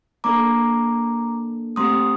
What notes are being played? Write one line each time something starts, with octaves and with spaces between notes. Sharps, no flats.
A#3 D4 A4 A#5 D6
A3 C4 G4 C6 D#6